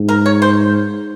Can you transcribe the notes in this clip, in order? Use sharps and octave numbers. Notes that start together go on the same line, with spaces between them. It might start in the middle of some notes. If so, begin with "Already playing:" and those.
Already playing: G#2
A#4
C#5
C5